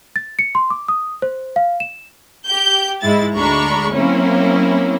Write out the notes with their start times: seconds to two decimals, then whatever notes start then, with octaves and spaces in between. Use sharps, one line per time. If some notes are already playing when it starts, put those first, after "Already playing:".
0.16 A6
0.39 C#7
0.55 C6
0.70 D6
0.88 D#6
1.22 C5
1.56 F5
1.80 E7
2.47 G4 G6
3.02 G#2 G#3 E4 A6
3.36 D2 G#3 D4 A#5 B5 C#6
3.92 F#3 A#3 C4 C#4 E4